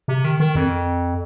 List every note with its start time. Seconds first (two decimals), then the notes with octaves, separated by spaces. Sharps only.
0.08 C3
0.24 D#3
0.40 D#3
0.55 F2